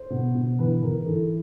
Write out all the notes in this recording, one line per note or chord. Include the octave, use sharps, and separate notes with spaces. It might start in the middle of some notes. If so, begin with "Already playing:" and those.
Already playing: C5
B2
B2
E3 B4
E3 A#4
E3 A4